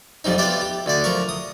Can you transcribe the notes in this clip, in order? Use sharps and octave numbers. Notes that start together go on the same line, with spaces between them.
F2 F3 G3 C4 D#4
B3 F4 G4 D5 E5
G4
D2 D3 D5
F3 A#4 C#6
D#6